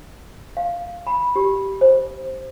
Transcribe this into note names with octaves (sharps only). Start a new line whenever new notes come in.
F5
B5
G4
C5